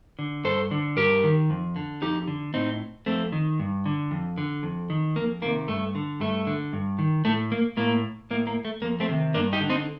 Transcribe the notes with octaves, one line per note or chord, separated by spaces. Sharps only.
D3
G2 A4 C5
D3
G2 G4 A#4
D#3
F2
D3
F2 D#4 G4
D3
A2 C4 D#4
F2 A3 C4
D#3
G2
D3
F2
D3
F2
D#3
F2 A#3
C3 D#3 A#3
G2 A3
D3
G2 A3
D3
G2
D#3
A2 A3
A#3
A2 A#3
A2 A#3
A#3
A3
F2 A#3
A3 C4
C3 D#3
G2 A#3 D4
D#4 G4
D3
C4 D#4